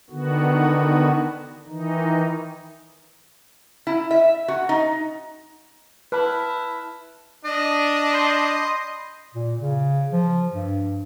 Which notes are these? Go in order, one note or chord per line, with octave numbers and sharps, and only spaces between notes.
D3 D#3 B3 F#4
D#3 E3 D#4
E4
E5
F#4
D#4
E4 B4 A5 B5 F6 F#6
D4 D#5
B5 C6 G6
A#2
C#3
F3
G2